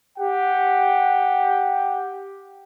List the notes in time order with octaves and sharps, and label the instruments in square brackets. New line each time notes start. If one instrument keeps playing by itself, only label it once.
[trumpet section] G4 F#5 G5